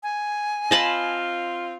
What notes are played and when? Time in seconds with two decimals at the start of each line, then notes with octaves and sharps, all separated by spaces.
0.03 G#5
0.71 C4 F4 D#5 A5 B5